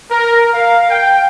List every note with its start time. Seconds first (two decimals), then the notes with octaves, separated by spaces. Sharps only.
0.10 A#4
0.54 F5
0.89 G5